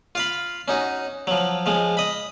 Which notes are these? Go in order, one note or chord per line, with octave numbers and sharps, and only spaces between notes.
F4 F5 B5
C#4 D#4 F#4
F3 F#3
F3 G#3
D#5 B5